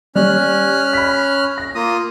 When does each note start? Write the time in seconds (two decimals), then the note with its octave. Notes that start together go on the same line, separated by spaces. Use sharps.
0.15 G3 C#4 F6 F#6
0.93 B5 B6
1.58 A#6
1.75 A#3 F4 D#6